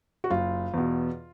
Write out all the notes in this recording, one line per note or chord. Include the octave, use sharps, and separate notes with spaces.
F#4
F#1 F4
E2 B2